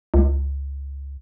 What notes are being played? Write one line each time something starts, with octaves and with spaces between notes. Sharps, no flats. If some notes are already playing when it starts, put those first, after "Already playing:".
C#2